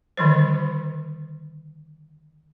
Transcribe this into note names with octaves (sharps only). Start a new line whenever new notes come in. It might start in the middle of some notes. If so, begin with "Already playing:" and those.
D3 D#3 F3 G3 C5